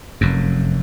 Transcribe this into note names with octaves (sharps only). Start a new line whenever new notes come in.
F1 F#2